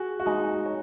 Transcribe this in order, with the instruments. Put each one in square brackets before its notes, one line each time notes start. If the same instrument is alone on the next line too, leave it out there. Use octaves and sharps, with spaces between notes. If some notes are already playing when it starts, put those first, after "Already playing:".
Already playing: [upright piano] F#4 [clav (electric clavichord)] G#4
[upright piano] F#4
[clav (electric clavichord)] G#3 [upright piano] D#4
[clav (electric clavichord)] C#5